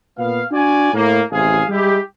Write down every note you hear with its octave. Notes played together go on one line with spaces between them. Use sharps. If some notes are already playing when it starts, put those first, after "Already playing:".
A#2 B3 F5
D4 F#4 D5 G#5
A2 A#3
A1 C3 G#4 F5 G#5
G3 G#3 E4 G4